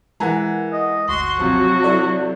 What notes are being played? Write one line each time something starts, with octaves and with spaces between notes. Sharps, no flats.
E3 G#3 A#4 F#5 G#5 A#5
D#5
G1 D2 F#4 C6
C3 F3 F#3
E4 A4 D5